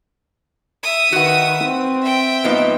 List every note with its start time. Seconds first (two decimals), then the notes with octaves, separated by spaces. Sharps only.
0.83 E5 D#6
1.12 D#3 F#4 B4 F#5
1.65 C4
2.01 E5 G5
2.44 G#2 F3 A#3 B3 D#4